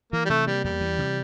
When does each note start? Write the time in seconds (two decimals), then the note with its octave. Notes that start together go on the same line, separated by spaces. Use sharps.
0.13 E3 A#3
0.25 G3
0.29 C3 A3
0.47 G3 A#3
0.64 E2 G3
0.81 E3
0.99 C3